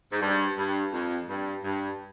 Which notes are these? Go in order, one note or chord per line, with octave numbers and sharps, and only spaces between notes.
G#2
G2
G2
F2
G2
G2